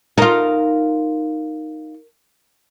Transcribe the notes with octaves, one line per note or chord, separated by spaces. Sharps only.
D#4 F4 A#4